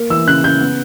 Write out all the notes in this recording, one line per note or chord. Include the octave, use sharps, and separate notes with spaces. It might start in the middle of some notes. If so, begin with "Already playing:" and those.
Already playing: A#3
E3 E6
C#3 F#6
C#3 G6
B3